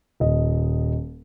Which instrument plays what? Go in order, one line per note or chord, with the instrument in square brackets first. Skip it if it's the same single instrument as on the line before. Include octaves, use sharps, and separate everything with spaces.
[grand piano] D#1 D#5